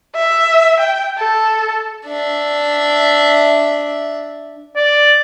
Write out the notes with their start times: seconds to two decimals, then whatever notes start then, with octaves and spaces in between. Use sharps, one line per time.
0.16 E5
0.80 G5
1.18 A4
2.07 D4 E5
4.77 D5